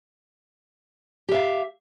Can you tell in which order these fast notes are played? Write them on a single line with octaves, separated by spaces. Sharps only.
G4 E5 F5